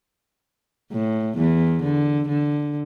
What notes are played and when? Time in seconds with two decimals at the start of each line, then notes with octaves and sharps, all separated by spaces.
0.93 A2
1.37 E2 E3
1.82 D3
2.28 D3